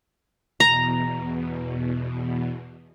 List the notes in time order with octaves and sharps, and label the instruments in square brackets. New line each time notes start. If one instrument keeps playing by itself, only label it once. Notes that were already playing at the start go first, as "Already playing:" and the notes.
[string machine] E2 B2 [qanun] A#5